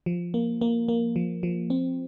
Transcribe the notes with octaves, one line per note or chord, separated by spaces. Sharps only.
F3
A#3
A#3
A#3
F3
F3
C4